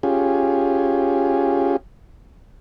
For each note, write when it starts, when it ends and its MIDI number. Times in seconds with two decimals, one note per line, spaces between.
0.03 1.77 61
0.03 1.77 65
0.03 1.77 67
0.03 1.77 68